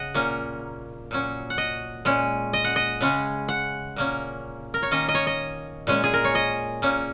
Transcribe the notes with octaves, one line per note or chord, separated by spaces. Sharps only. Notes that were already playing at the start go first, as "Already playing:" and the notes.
Already playing: C#3 D#5 F#5
A#2 A#3 C#4
A#2 F#3 C#4
F#5
D#5
A#2 G#3 C#4
D#5
F#5
D#5
C#3 G#3 C#4
F#5
A#2 A#3 C#4
A#4
C#5
D#3 A#3 C#4 D#5
D#5
C#5
D#5
A#2 G#3 C#4
G#4
A#4
C#5
D#5
A#2 A#3 C#4